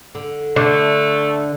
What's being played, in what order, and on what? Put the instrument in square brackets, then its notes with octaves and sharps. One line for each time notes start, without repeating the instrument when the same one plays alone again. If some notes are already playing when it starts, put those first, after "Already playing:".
[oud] D3
[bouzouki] D3 [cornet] A3 [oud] D4